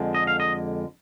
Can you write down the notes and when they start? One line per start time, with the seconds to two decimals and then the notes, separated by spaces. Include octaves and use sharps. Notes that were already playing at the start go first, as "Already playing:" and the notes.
Already playing: F2 D3 G#3
0.14 D#5
0.27 F5
0.40 D#5